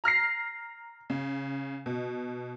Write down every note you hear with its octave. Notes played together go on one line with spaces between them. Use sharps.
A#5 F6 A#6 C7
C#3
B2